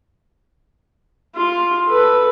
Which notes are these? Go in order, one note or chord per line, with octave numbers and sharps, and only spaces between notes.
F4
A4 B4